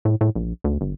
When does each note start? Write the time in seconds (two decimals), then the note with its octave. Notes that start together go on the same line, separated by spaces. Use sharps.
0.05 A2
0.21 A2
0.35 A#1
0.64 D2
0.81 G1